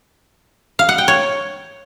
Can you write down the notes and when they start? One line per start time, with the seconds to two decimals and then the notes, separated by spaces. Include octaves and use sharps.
0.79 F5
0.89 F#5
0.98 G5
1.08 C#5